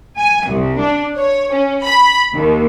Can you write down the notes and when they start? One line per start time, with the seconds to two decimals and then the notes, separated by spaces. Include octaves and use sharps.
0.18 G#5
0.49 C2
0.80 D4
1.16 C#5
1.52 C#4
1.84 B5
2.35 D#2